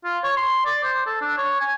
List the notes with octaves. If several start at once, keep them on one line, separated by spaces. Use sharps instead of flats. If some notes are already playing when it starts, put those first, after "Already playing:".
F4
C#5
C6
D5
C5
A4
D4
C#5
G#5